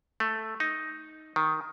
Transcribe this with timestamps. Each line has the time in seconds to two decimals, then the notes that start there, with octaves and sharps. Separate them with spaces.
0.20 A3
0.60 D#4
1.36 D#3